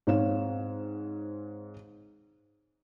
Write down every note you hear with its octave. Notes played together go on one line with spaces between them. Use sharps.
G#2 C4 C#5 F5 E7